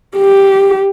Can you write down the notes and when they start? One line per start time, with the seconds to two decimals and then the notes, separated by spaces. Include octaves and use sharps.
0.17 G4